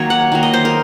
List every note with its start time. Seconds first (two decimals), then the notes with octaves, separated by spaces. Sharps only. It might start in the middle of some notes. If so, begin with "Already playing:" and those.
Already playing: D#3 F#3 A#3 C#5
0.10 F#5
0.32 D#3 F#3 A#3
0.43 D#5
0.54 C5
0.65 A#4